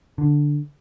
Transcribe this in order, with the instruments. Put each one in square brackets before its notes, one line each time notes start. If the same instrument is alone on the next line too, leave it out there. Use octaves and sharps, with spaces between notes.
[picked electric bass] D3